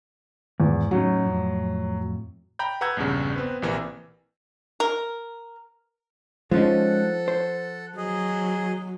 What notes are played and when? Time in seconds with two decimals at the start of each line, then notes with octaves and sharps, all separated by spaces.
0.60 E2 G#2
0.91 A2 F#3 C#4 D#4
1.25 F2 A2
2.59 G5 A#5 B5 G6
2.81 B4 F#5 A#5 E6 G6 G#6
2.97 A#1 E2 G2 C#3
3.36 B3 C4 B4
3.62 A#1 C3 E3 A#3
4.80 A#4
6.51 F3 G#3 C#4 D#4 A4 F#5
7.28 C5
7.97 F#3 G#4 D#5